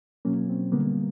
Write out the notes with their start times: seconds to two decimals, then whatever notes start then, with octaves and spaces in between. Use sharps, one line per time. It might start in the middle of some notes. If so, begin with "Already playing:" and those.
0.25 B2 F#3 A#3 C#4
0.49 C4
0.72 D3 G3 A#3 B3